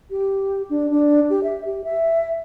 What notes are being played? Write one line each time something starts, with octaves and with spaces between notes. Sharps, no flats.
G4
D4
D4
G4
E5
G4
E5